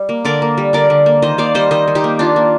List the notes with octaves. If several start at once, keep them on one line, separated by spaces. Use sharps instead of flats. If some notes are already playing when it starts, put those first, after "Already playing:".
Already playing: G3
A#3
D3 A#4 D5
A#3
G3
D3 A#4 D5
D3
A#3
D#3 C5 D#5
A#3 D5 F5
G3 C5 D#5
D#3 C5 D#5
D#3
D#4 G4
A#3
D#3 D4 F4
A#3